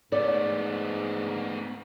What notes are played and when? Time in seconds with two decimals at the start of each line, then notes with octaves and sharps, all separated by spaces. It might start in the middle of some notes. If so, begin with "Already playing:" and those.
0.12 G#2 A3 B3 D5